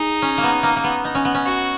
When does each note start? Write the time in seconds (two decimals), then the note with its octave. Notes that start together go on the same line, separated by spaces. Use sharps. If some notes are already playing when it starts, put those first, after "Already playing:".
Already playing: D#4 G#4
0.22 C#4
0.38 A#3
0.43 B3
0.63 A#3
0.76 A#3
0.84 B3
1.05 D#4
1.15 C#4
1.25 B3
1.35 C#4
1.46 F#4